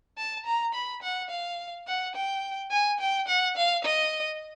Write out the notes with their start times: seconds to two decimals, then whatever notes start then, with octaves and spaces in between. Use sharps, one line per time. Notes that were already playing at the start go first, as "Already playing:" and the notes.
0.18 A5
0.46 A#5
0.74 B5
1.02 F#5
1.30 F5
1.87 F#5
2.15 G5
2.71 G#5
3.00 G5
3.28 F#5
3.57 F5
3.84 D#5